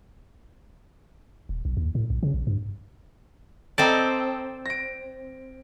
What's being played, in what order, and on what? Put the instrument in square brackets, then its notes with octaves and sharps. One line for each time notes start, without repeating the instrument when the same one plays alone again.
[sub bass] D#1
B1
D#2
A2
B1
C#3
A#1
G2
[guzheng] C4 C5 D5 [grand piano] A4 D#5 A#5
[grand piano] A#6 D7